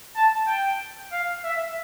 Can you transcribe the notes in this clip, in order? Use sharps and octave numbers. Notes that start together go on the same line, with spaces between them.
A5
G5
F5
E5